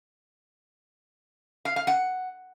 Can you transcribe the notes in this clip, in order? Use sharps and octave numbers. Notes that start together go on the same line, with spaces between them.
F5
F5
F#5